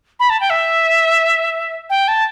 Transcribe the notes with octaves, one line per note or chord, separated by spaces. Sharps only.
B5
A5
G5
E5
G5
A5